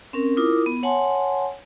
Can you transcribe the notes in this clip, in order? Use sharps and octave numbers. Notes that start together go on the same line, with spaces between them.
C4 C#4 A#4
E4 F4 A#4 D6 D#6
B3
C#5 F#5 G#5 A5 C6